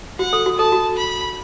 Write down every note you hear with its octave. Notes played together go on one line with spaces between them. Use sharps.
F#4 F#5
A4
F#4
A4 A5
F#4
B5